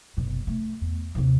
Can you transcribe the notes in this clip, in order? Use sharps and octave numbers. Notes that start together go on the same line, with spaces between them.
F#1 B2
A3
E2
D#2 C3